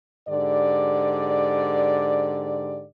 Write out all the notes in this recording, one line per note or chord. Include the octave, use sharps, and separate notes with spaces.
G#2 D3 G4 D5